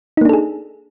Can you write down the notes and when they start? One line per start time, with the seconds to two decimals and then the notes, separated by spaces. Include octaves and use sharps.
0.17 D#4
0.21 A#3
0.25 D4
0.29 A4
0.33 G#4